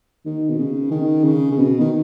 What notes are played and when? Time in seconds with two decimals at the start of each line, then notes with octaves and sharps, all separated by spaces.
0.26 D#3
0.50 B2
0.58 C#3
0.91 D#3
1.24 C#3
1.52 C#3
1.57 B2
1.80 D#3